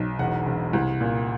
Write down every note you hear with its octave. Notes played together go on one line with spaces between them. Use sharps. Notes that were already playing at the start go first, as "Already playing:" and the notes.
Already playing: B1
E1 F#5
E1
C2
A#2